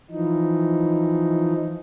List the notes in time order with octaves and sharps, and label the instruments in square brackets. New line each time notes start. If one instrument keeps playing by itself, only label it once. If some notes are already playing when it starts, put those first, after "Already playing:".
[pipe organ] E3 F3 D#4